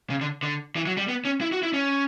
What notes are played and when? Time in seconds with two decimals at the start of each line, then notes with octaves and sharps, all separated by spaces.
0.10 C#3
0.21 D3
0.43 D3
0.76 E3
0.87 F#3
0.97 G3
1.08 B3
1.25 C#4
1.41 E4
1.52 F#4
1.63 E4
1.74 C#4